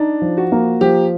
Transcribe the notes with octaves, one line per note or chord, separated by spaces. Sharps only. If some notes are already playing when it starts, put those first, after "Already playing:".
Already playing: D4 D#4
F3
F#4
A#3
F3 G4